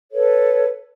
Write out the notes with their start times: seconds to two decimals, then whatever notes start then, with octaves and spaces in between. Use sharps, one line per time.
0.12 A4 B4 C#5